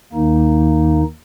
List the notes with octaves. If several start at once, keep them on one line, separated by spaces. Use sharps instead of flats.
D#2 D#3 A#3 D#4